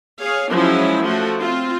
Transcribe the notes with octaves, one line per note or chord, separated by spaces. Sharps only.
G#4 C#5 F5
F3 F#3 G#3 C#4 E4
F3 A3 F#4
C4 F4